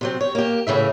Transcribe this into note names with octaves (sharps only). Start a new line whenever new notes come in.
C3 F#3 C4
C#5
A#3 G4
A2 C#3 E3 E5